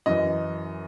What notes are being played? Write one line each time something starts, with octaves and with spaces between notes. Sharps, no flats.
F#2 E3 D#5